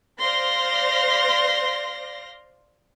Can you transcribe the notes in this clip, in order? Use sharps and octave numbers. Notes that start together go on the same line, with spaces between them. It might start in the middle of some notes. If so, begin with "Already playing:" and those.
C5 D5 F5 C6 A#6